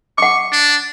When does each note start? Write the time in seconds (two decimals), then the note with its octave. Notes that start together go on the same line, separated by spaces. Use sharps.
0.18 F#5 C#6 D6
0.52 D4